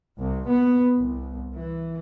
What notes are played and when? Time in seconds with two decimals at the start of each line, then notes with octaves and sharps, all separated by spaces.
0.17 C2
0.48 B3
0.98 C2
1.56 E3